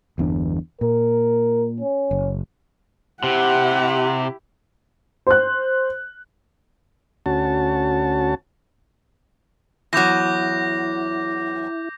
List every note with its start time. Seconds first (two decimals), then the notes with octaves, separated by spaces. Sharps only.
0.18 G1 E2 D4
0.81 A#2 A#4
1.80 C#4
2.11 F#1
3.23 C3 E4 G4 F#5
5.27 C5 F#6
7.26 D2 C#4 F#4 A5
9.93 E2 F#3 E4 D6 G6 A#6